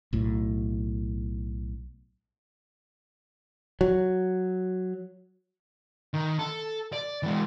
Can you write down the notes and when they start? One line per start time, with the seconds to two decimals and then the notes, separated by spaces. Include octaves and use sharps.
0.13 B1 A2
3.81 F#3
6.14 D#3
6.39 A4
6.93 D5
7.23 E3 G#3